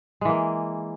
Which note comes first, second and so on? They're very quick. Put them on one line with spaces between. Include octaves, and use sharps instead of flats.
G#3 E3 A#3